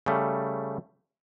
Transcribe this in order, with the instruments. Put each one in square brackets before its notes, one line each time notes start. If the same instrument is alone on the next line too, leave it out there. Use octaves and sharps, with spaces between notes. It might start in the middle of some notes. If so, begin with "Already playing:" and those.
[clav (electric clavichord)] C#3 G3 A3